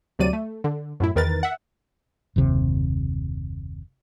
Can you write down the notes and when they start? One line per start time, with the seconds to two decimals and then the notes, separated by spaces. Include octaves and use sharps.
0.19 D2 C3 F#3 D5 D#7
0.33 A3
0.64 D3
1.00 F#2 A2 E4
1.16 E2 D#3 A#4 B4 A6
1.43 E5 F#5
2.36 F#1 D#2 C3